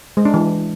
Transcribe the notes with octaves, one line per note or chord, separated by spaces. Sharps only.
G#3
D4
E3